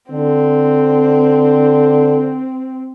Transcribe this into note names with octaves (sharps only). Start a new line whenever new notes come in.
D3 C4